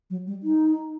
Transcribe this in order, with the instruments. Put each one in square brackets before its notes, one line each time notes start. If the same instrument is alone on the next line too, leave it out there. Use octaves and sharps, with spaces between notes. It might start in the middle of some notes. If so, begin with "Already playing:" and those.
[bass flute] F#3
G3
D#4